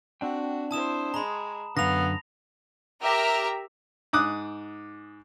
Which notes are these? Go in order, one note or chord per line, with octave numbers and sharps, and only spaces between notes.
C4 D4 F#4 G5
E4 C5 A5 D#6 E7
G#3 A#5 B5
F#2 A2 D3 B3 F5 A#6 F7
G4 A#4 E5 A#5
G#2 D6 D#6 F#6